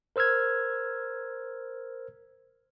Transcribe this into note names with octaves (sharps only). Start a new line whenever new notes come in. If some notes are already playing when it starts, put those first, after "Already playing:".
A#4 C5 E6 F6 G#6